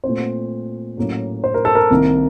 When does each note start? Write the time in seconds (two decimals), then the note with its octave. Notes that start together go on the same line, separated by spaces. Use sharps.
0.04 A#2 A3 C4 C5
0.97 A2 F#3 A#3 C#4
1.44 C5
1.54 A#4
1.65 A4
1.75 A#4
1.91 C2 C3 D#3 A#3